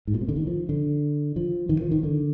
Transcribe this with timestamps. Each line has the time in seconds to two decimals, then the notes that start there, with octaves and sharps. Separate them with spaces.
0.07 G#2
0.14 A#2
0.21 C3
0.29 D3
0.36 D#3
0.47 F3
0.69 D3
1.36 F3
1.69 D#3
1.81 F3
1.91 D#3
2.03 D3